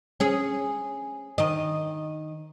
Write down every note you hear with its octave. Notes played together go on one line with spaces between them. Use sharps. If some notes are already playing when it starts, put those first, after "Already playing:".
C#4 G#4
D#3 D#5